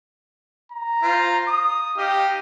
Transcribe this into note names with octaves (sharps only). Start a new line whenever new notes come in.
A#5
F4 C5
D#6
D#4 G4 D#5 F5